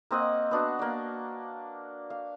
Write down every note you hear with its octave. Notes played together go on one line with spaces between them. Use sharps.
A#3 C4 D#5 F#5
B3 D4 F#4
A#3 D5
F5